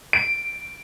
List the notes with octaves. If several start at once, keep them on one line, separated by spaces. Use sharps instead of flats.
D7